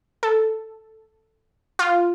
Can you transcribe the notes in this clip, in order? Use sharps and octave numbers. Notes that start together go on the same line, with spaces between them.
A4
F4